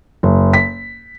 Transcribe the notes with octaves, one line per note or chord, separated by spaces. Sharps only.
F#1
B6